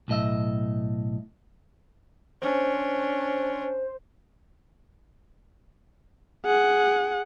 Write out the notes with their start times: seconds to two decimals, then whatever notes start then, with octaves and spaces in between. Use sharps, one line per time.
0.08 B1 A2 D#5 E5
2.42 C#4 D4 C5
6.46 G#4 F#5